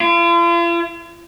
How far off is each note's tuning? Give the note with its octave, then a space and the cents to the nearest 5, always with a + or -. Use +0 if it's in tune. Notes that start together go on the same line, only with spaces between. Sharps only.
F4 -45